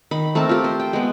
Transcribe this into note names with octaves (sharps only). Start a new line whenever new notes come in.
D#3 B5
A3 C4 A#4 A5
F4 G4
C5
G5
G#3 B3